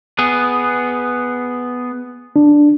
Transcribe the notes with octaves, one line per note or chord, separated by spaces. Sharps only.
B3 G#4
D4